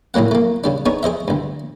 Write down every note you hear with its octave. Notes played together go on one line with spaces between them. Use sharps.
C2 A2 F#3 A#3 F#5
A3 A#3
C#3 G3 D4
B3 D#4 G#4 C#5
G#4 C5 D#5 E5
D2 G2